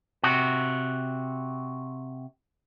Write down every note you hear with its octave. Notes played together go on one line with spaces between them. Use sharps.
C3 F#4